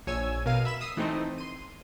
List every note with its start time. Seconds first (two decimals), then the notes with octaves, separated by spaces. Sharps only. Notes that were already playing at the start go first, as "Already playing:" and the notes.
0.07 A#1 C#5 G#5 E6 G#6
0.45 B2 A#4 F5 D#7
0.65 E5 B5 E7
0.81 D#6 E6 C7
0.97 E3 A3 C4 D#4 C5
1.38 C6 D#7